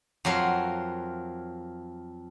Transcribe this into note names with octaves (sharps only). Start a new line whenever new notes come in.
F2 F#3 A#4 F5